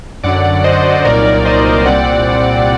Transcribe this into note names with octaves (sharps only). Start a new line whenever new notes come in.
F#2 D3 F#3 D5 F#5
C5 D#5
C2 A#2 F#3 A#3 D#4 A#4 D5
C5 D#5
C2 A#2 G3 C4 D5 F#5